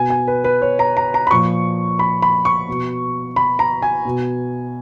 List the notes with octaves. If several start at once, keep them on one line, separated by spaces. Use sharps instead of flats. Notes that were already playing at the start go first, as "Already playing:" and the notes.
Already playing: B2 G#5
G#5
B4
B4
C#5
A#5
A#5
A#5
B5
A#2 F3 C#6
B5
B5
C#6
B2
B5
A#5
G#5
B2